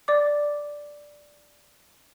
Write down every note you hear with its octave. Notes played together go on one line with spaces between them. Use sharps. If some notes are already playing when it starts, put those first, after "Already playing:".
D5 D6